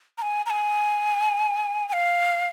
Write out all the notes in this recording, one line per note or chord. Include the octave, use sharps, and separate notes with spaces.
A#5
G#5
A#5
G#5
G#5
F5